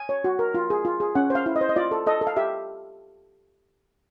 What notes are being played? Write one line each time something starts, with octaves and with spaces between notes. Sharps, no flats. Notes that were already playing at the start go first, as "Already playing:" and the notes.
Already playing: G#5
C#5
F#4
A#4
F4
G#4
F4
G#4
C#4 F#5
C5 F5
E4
D#5
C5
D#5
F4 D5
A4
A4 D#5
A4
F5
G4 E5